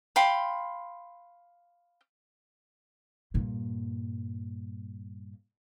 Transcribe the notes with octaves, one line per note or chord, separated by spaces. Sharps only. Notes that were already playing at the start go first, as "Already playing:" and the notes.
F5 G5 B5 C6
G2 A#2